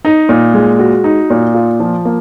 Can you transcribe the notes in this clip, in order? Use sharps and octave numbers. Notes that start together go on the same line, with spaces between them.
D#4
A#2
G#3
F#4
D#4
A#2
F4
F3
A#3